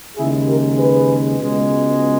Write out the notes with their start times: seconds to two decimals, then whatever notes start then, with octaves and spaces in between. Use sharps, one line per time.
0.17 D#2 C#3 G#3 E4 G#4
0.47 G4 A#4
0.77 G#4 B4
1.38 C#2 B2 G#3